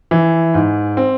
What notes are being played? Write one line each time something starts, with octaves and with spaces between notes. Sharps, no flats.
E3
G#2
C4